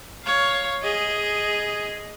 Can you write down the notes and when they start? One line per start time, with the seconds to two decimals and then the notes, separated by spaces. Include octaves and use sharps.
0.24 C#5 F5
0.83 G#4 D#5